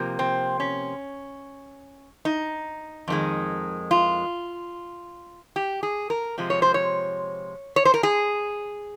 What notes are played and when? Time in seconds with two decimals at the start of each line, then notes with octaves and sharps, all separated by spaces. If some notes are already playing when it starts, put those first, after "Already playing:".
Already playing: C3 F3 A#3
0.19 C4
0.60 C#4
2.25 D#4
3.08 F2 D#3 G#3
3.91 F4
5.56 G4
5.83 G#4
6.10 A#4
6.38 C3 F3 G#3
6.50 C#5
6.62 C5
6.74 C#5
7.76 C#5
7.85 C5
7.94 A#4
8.03 G#4